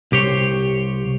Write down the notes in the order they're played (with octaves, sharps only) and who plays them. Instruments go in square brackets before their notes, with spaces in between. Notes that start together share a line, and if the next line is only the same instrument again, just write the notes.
[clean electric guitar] C2 G4 C5 C#5